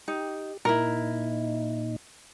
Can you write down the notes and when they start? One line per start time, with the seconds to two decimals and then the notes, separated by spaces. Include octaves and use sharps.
0.08 D#4 G4
0.65 A#2 D#4 E4 A#4